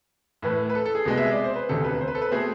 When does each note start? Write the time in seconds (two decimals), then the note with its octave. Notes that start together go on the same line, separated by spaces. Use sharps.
0.42 A2 E3 A3 B4
0.70 B4
0.75 A4
0.86 A4
0.95 G#4
1.06 C2 B2 G#3 B3
1.17 E5
1.31 D5
1.44 C5
1.56 B4
1.69 E1 D2 C3 A4
1.85 B4
2.01 C5
2.08 B4
2.15 A4
2.22 B4
2.31 B2 A3 C4 G#4